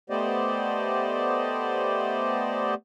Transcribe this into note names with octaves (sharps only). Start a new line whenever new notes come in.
A3 B3 G4 C5 D5 D#5